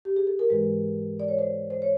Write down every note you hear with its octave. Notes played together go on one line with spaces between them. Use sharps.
G4
G#4
A4
A#4
G#2 E3 G#3 B4
D5
C#5
C5
C5
C#5